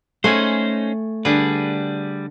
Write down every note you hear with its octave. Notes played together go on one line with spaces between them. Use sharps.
A3 C#4 D#4 C5 F#5 G#5
D3 G3 G#4 B4